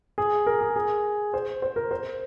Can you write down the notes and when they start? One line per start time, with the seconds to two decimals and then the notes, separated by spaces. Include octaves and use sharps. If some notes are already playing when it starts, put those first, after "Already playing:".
0.18 G#4
0.46 A#4
0.61 G#4
0.76 G#4
1.34 C5
1.62 C5
1.76 A#4
1.91 C5